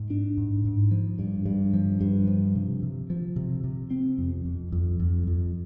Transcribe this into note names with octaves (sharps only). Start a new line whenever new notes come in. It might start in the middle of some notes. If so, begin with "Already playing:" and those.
Already playing: G#2
D4
G#2
G#2
F3
G2
G2
F3
G2
F3
C3
C3
F3
C3
C3
C4
F2
F2
F2
F2
F2